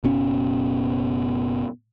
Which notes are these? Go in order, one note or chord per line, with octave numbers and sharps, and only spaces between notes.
F#1 B2 C#4